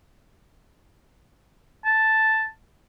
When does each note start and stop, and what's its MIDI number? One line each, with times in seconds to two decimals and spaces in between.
1.85 2.47 81